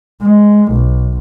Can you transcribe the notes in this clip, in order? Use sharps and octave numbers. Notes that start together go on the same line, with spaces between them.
G#3
B1